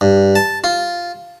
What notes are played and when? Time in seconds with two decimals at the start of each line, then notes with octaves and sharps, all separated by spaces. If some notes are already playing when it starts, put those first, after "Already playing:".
0.01 G2
0.35 A5
0.64 F4